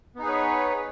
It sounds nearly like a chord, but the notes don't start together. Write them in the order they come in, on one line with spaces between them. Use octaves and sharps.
B3 D#4 G#4 B4 C#5